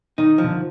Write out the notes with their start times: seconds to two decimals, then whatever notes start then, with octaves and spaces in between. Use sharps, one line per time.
0.18 D#3 D#4
0.38 F3
0.44 D3
0.52 D#3